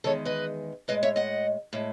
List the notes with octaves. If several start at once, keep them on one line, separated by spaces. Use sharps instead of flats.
E2 D#3 G#3 A4 C#5
B4 D#5
A2 G#3 B4 D#5
C#5 E5
D#5 F#5
A2 G#3